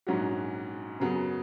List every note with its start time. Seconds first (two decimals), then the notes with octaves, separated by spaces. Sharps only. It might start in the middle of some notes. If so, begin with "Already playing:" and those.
0.07 A#1 G#2 F#3 C#4 F#4
1.00 F#2 C#3 F#3 B3